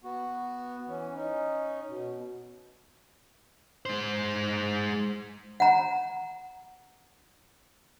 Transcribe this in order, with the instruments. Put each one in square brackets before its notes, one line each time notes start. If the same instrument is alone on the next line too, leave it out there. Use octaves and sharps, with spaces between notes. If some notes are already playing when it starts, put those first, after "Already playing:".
[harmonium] B3 F#4
E3 C#4
C#4 D#4
B2
[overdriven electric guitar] G#3 C5
[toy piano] F#5 A#5